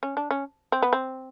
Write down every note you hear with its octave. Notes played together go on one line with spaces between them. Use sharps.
C#4
D4
C#4
C4
B3
C4